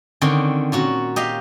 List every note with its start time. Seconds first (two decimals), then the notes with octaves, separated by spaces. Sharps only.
0.21 D3 D#3 C4 C#4
0.72 A#2 C#4 F#4
1.16 G4 D#5 F5